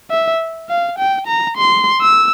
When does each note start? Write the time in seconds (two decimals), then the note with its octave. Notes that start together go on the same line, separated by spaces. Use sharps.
0.10 E5
0.69 F5
0.99 G5
1.27 A#5
1.57 C6
2.01 E6